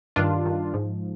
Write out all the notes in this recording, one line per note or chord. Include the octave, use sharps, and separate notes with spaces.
G2 D#3 D4 F4
G2 D#3
G#2 F3